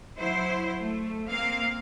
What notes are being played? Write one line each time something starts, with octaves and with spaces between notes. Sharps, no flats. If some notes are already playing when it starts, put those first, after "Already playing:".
F#3 E4 C5
A3
A#3 C4 F5